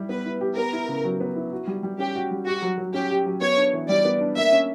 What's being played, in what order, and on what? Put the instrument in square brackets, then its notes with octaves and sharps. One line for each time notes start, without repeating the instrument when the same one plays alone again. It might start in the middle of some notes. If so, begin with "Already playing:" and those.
Already playing: [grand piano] G3 E4 G4
[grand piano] B3 [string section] B4
[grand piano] E4
G4
[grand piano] B3 [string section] A#4
[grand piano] E4
C#3
F#3
B3
E4
F#4
G3
G3
[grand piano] C#4 [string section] G4
[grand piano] F#4
G3
[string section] F#4 [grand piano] G4
[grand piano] F#3
F#3
[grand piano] C#4 [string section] G4
[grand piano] G4
F#3
[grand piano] B3 [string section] C#5
[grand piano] D4
E3
[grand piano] G3 [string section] D5
[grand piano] B3
D4
[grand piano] A#3 [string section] E5
[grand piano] C#4